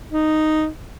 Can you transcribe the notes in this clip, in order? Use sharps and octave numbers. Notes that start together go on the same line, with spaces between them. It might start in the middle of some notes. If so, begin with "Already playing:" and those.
D#4